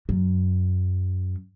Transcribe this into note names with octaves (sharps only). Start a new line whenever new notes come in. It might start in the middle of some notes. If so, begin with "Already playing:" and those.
F#2